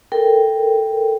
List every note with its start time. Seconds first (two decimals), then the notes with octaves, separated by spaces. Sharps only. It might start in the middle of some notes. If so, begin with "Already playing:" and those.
0.12 A4 A#4 G5